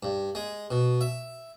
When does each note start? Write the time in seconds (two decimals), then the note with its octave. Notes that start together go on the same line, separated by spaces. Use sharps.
0.03 G2
0.35 G#3
0.71 B2
1.01 E5